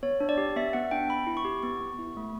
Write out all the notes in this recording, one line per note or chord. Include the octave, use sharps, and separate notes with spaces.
B3 C#5
D4
D5
G4
B3 E5
B3 F#5
D4 G5
B3 B5
E4
C#6
G4
B3 C#6
B3
E4
A3